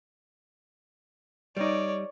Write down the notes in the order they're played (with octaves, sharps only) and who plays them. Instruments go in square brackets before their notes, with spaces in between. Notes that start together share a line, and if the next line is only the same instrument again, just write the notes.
[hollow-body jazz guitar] G3 D#4 [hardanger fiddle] C#5 D5